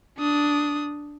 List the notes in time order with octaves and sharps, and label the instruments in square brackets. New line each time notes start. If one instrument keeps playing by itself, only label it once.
[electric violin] D4 D#6